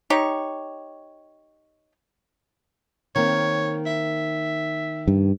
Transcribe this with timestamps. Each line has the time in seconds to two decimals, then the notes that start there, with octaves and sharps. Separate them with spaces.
0.10 D#4 G4 C#5
3.15 D#3 A#3 C4 C#5
3.86 E5
5.08 G2